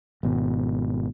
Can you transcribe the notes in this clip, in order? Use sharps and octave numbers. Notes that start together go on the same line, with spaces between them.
G#1 B2